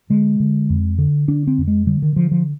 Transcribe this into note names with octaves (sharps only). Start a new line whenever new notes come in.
D3 G#3
D3
F2
D3
D3 D4
C4
F2
G#3
D3 G3
D#3
D3 F3
F3